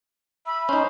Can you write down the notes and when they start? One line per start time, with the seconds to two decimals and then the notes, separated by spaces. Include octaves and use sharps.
0.46 E5 B5
0.69 C#4 D#4 C5